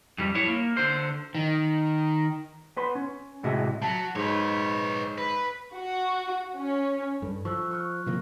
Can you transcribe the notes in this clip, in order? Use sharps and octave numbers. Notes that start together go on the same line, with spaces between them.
F2 G3
E4 C#5
A#3
D3 C5
D#3
B3 B4 C6
C#4
A2 C3 G#3 F#4 E5
F#3 F#4 A5 B6
G#2 B4 C#5
B4
F#4
C#4
G2 A4
F3 C#6 E6 F#6
C#6 F6 F#6
C3 F3 A#3